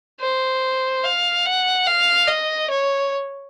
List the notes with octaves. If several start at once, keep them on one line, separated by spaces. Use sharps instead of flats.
C5
F5
F#5
F5
D#5
C#5